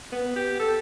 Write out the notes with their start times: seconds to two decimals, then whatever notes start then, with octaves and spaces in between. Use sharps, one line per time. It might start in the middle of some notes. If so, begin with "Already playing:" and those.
0.12 B3
0.36 G4
0.60 A4